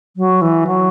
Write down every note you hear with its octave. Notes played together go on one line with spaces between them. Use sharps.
F#3
E3
F#3